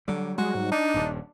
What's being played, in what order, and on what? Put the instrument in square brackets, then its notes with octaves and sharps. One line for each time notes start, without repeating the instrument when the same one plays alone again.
[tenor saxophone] D3 [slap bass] F#3 G3
[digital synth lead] G#3 [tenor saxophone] F#4
[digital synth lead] G#2
[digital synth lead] D4 [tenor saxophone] D#4
[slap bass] D#1 G2